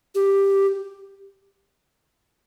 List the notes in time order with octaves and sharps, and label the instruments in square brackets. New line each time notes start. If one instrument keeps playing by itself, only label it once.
[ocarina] G4